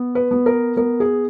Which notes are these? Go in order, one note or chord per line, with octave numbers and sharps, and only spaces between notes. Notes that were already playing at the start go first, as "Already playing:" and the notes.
Already playing: B3
B4
B3
A#4
B3 A#4
G#4